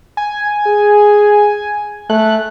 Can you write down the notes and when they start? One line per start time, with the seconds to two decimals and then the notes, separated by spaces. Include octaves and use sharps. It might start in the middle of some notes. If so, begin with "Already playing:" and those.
0.17 G#5
0.67 G#4
2.10 A3 F#6